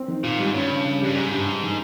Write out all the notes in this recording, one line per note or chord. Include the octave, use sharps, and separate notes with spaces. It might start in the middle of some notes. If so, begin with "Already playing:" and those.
Already playing: C4
D#3
A#2 F4
G#2 G3
G2 C#4
C#3
C#3
G2 G3
G#2 G3
G2
G2
D#3